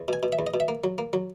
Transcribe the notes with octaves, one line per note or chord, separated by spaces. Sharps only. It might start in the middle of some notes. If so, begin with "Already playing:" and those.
Already playing: E2
B2 G#5
B2
E5
E2
D#5
B2
E5
A#3
F#3
A#3
F#3